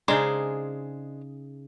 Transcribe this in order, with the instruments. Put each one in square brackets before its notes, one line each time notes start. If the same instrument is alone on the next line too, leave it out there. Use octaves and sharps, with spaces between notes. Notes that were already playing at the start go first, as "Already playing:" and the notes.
[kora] C#3 D#4 G#4 [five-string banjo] G#3 D4 C5